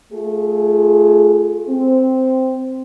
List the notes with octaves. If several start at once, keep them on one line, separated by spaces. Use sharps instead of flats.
A3 F4 G#4
C4